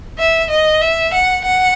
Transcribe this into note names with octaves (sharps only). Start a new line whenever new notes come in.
E5
D#5
E5
F#5
F#5